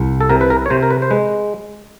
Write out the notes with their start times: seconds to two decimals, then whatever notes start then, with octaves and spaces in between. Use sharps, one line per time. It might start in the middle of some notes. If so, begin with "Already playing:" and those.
Already playing: C2
0.21 A4
0.30 C3 A#4
0.41 B4
0.50 A#4
0.66 C#5
0.70 C3 C5
0.83 A#4
0.91 B4
1.02 C5
1.10 G#3 B4